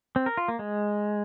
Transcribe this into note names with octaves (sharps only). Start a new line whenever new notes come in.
C4
A#4
F4
A#3
G#3